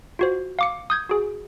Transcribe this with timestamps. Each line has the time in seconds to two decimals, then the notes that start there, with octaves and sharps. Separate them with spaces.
0.19 F4 F#4 C5
0.59 F5 D6 C#7
0.90 D#6 G6 G#6
1.09 F#4 G#4